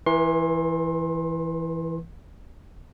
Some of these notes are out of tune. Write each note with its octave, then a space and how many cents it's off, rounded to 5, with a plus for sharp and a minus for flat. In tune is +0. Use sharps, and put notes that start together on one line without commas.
E3 +0 B4 -45 C6 +30